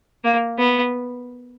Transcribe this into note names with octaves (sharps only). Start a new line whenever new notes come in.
A#3
B3